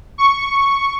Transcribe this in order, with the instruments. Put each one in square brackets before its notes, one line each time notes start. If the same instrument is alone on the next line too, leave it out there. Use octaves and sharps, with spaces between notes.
[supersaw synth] C#6